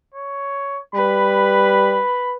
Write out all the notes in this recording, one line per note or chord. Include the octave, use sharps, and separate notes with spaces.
C#5
G3 B4 B5